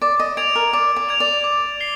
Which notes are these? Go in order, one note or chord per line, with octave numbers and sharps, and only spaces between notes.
D5 D6
D#5
D5 G#6 D7 F7
A#4
D5 D6
D5
G#6 D7 F7
D5
D6
C7 G7